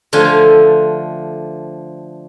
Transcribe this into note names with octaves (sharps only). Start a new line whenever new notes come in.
D3 F3 A3 F4 G#5